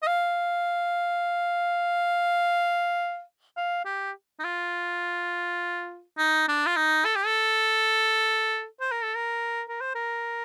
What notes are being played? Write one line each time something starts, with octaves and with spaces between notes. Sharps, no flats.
D#5
F5
F5
G4
D#4
F4
D#4
D4
F4
D#4
A4
G4
A4
C5
A#4
A4
A#4
A#4
C5
A#4